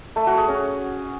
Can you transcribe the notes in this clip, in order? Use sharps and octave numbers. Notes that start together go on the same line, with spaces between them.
A3
F#4
G#4
C#4